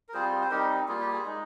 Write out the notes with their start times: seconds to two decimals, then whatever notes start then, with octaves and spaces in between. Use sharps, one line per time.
0.09 A#4
0.13 G3 C4 F4 G#4 C5
0.42 C5
0.50 G3 C4 D#4 G4 A#4
0.88 G3 A#3 F4 G#4
1.01 G4
1.12 G#4
1.25 G#3 D#4